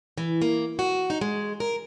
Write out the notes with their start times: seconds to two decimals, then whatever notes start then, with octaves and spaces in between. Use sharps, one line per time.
0.18 E3
0.42 A#3
0.79 F#4
1.10 D#4
1.21 G#3
1.60 A#4